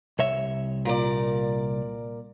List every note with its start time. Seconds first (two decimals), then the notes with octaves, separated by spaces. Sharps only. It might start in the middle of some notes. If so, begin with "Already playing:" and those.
0.19 C2 C#5 E5
0.85 A#2 A#4 D5